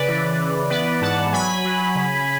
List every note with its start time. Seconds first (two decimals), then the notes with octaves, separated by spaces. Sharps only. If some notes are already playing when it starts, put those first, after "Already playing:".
Already playing: C#3 B4 D5
0.08 E3
0.40 E3
0.70 B3 B4 D5
1.01 G#2 F#5 A5
1.33 F#3 G#5 B5
1.65 F#3
1.95 C#3